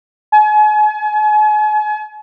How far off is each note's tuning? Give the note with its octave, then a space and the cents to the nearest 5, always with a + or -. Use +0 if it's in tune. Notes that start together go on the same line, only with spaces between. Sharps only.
G#5 +40